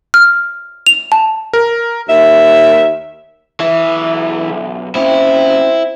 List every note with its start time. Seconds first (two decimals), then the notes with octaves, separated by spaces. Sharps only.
0.14 F6
0.87 F7
1.12 A5
1.53 A#4
2.08 D#2 E5
3.60 B1 E3 E5
4.95 A#3 C4 C#4 E4